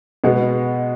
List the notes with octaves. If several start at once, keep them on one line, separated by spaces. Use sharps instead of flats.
B2 G#3 B3